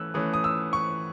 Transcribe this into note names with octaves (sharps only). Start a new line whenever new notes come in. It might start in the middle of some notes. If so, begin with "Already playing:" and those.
Already playing: E3 A3 C#4 E6 F#6
E3 A3 C#4 D#6
D#6
E6
C#6